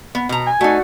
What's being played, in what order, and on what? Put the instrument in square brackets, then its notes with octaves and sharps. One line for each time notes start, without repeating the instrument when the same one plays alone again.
[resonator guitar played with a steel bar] B3
B2 A#5
[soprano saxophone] G#5
[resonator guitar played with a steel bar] A3 D#4 [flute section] F#4 D5 F#5